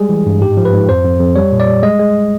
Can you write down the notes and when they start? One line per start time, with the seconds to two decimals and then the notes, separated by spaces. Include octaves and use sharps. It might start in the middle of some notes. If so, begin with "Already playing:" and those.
Already playing: G3 G#3 G#4
0.09 E3
0.26 G2
0.41 G#2 G4
0.57 F3
0.65 B4
0.73 G#2
0.89 F2 C5
1.04 F2
1.20 F2
1.36 G3 C#5
1.52 A#2
1.60 D5
1.67 G3
1.83 G#3 D#5
1.99 G#3